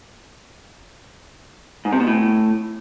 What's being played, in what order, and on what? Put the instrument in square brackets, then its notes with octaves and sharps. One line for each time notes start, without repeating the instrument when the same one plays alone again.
[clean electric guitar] G#2
C3
B2
A2